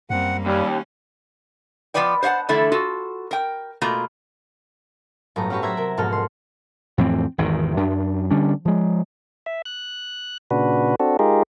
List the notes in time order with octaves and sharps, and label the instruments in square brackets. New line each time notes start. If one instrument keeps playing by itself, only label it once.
[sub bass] F#2 [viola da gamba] G3 A#3 C4 [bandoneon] F#5
[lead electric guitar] D#2 [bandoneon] G3 [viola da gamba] C#4
[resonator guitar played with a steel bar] F3 A3 B3 B4 D5 G5
C5 C#5 F5 F#5 A5
D3 E3 F3 A3 E4 A4
F4 F#4 A4
A#4 G5
B2 A3 A#3 F4 A#5
[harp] G1 A2 F#3 A3 B4 A#5
C#4 D4 F#4 G4 B4 C#5
C5 E5 F#5 A#5 G#6 B6
C3 A#4
F1 G#2 B2 F#4 A4 F6
C6
[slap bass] F2 A2 E3 C4
G#1 E2 D#3
F#2 D4
D3 G3 C#4 D4
F3 G#3
[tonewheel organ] E5
F#6
A#2 C#3 D4 F#4 B4
C4 D4 F#4 A4
G#3 D#4 F4 G4 G#4 A#4